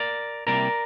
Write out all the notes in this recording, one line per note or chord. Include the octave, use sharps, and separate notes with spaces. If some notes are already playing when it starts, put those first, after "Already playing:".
Already playing: A#4 D5
C3 G3 A#3 E4 A#4 D5